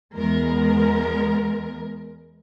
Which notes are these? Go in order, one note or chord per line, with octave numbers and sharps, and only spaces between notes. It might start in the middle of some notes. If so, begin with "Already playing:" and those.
E2 G#3 B3 A#4